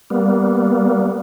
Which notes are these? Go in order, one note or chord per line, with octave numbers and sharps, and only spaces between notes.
G3 A#3 B3